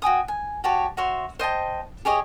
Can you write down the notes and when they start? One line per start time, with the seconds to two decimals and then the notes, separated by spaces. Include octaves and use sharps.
0.02 F#4 G5 G#5 D#6
0.28 G#5
0.64 F#4 G4 C#5 A5
0.97 F#4 C#5 E5 C6
1.39 C5 D#5 G5 A5
2.05 G4 G#4 C#5 D#5